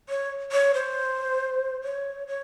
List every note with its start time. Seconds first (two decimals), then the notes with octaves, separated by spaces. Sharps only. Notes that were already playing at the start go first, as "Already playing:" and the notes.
0.09 C#5
0.52 C#5
0.74 C5
1.84 C#5
2.28 C#5